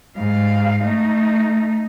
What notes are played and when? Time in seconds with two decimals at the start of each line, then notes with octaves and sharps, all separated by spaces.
0.17 G#2 F5
0.85 A3 D#4